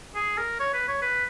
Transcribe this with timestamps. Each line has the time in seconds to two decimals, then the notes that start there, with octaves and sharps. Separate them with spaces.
0.15 G#4
0.38 A#4
0.59 C#5
0.74 B4
0.88 C#5
1.02 B4